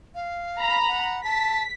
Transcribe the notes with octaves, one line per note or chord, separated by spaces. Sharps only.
F5
A#5 B5
F#5
A5 B6